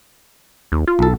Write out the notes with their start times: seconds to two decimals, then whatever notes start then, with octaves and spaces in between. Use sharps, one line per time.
0.72 D#2
0.87 F4
0.99 B1 A4